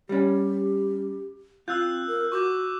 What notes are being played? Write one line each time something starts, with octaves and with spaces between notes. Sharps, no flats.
G3 C#4 G4
C4 F4 E6 F#6 G6
A#4
F#4 C#6 D6 G6